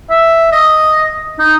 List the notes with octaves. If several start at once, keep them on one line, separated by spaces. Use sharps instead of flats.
E5
D#5
D#4